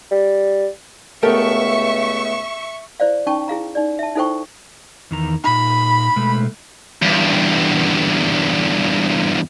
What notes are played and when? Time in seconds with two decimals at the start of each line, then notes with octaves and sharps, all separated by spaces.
0.11 G3
1.23 C#2 A3 B3 G4 A4 A#4 E5 C#6
3.00 E4 C5 D5 F5
3.27 C#4 D#4 G5 A5 C#6
3.48 E4 G#4 F5 A#5
3.75 D#4 D5
3.99 E5 A5
4.15 D#4 E4 A4 C5 G5 C#6
5.11 E2 D#3 A#5
5.44 A#2 D#4 B5
6.16 B2 G#3 A3
7.02 E2 G2